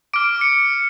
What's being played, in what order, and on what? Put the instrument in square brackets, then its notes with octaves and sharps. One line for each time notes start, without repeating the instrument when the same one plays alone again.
[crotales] D6 F6 D7
C#7